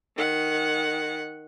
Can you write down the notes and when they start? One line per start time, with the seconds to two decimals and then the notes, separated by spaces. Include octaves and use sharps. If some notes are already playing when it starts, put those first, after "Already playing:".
0.17 D#3 F#5